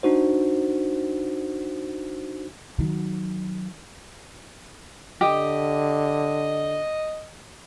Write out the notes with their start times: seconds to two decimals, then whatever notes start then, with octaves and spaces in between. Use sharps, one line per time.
0.03 D4 D#4 F#4 C5
2.79 D#3 F#3
5.21 D3 G4 D#5